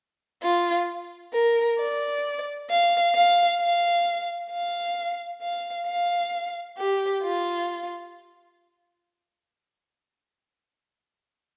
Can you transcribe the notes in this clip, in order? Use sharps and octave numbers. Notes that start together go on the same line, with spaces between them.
F4
A#4
D5
F5
F5
F5
F5
F5
F5
G4
F4